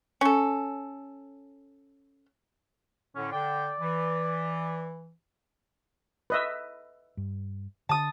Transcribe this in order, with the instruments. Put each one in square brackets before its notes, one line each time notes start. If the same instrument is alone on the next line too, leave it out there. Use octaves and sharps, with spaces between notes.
[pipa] C#4 A4
[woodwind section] A2 D3 [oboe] C#4
[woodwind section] D3 G5 [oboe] D5
[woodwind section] E3
[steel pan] B4 D#5 E5
[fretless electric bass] G2
[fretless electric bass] D3 [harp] A5 D#6